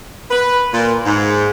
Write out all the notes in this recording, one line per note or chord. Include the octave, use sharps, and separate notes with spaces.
B4
A#2
G#2